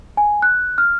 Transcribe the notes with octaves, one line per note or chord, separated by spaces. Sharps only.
G#5
F#6
F6